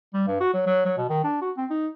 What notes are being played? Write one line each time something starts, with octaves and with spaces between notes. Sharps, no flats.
G3
G2
F#4
F#3
F#3
F#3
B2
D#3
D4
F#4
C4
D#4